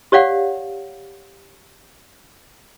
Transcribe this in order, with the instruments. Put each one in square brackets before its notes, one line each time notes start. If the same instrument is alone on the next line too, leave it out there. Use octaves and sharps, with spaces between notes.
[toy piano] G4 C#5 D5 F5 F#5